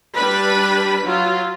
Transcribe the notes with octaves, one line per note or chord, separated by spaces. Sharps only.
G3 D4 B4 B5
F#3 F4